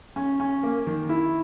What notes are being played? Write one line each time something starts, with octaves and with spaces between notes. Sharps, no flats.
C#4
C#4
A#3
D#3
E4